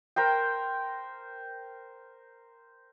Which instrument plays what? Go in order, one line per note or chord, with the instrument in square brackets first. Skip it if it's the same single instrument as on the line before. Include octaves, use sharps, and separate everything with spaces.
[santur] A#4 C5 G5